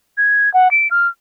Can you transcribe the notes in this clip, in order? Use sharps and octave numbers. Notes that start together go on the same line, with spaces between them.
G#6
F#5
D7
F6